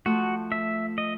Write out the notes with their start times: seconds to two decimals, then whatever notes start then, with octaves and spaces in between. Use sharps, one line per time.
0.06 F3 A3 F#4
0.52 E5
0.98 D#5